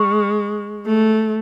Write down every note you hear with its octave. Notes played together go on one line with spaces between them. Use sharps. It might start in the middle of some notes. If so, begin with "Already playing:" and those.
Already playing: G#3 C#6
A3